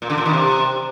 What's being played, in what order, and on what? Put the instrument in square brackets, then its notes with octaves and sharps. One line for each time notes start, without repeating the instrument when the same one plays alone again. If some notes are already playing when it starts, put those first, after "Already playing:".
[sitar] A#2
D3
A#2
D#3
C3